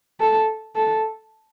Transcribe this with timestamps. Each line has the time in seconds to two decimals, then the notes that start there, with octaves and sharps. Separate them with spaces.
0.21 A4
0.76 A4